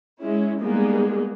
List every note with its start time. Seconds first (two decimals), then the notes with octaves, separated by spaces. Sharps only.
0.21 G#3 C#4 E4
0.60 G3 G#3 A#3 B3 D#4 G#4